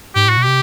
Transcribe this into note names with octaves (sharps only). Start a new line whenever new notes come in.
G#2 G4
A2 F#4
B2
C3 G4